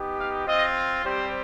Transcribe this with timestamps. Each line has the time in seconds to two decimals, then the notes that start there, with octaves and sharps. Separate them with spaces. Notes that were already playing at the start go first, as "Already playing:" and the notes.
Already playing: B3 D#4 G4
0.18 F5
0.47 C4 F4 D#5
1.05 G3 C4 G4 C5